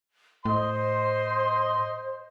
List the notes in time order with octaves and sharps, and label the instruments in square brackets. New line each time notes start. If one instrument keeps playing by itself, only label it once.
[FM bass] A2 [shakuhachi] C5 [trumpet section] D#5 [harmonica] C6